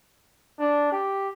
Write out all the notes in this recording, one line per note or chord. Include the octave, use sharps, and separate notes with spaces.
D4
G4